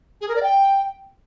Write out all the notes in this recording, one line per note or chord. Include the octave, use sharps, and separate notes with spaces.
G#4
A#4
D5
G5